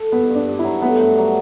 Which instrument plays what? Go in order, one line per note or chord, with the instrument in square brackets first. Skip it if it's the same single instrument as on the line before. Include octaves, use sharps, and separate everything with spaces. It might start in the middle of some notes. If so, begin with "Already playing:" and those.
Already playing: [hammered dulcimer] A4
[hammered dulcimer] G2 [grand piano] B3
[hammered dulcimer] G2
[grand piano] D4
[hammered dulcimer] G2
[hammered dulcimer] F#3 [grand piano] E4
[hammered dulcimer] A3 [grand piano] B3
[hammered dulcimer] G2
F#3